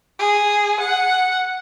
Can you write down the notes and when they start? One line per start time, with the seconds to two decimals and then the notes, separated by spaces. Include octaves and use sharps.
0.19 G#4
0.80 F#5